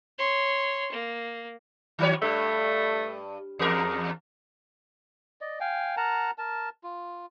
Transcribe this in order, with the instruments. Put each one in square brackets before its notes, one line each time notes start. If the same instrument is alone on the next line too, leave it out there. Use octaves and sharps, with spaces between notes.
[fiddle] C#5 C6
A#3
[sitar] D#3 F#3 C#5
[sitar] G2 [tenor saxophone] A3
[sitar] E2 A#4 [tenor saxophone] G#4
[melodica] D5 D#5
F5 G5 G#5
A#4 F#5 A5 A#5
A#4 A5
F4